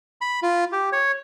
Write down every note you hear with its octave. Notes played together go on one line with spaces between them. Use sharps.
B5
F4
G4
C#5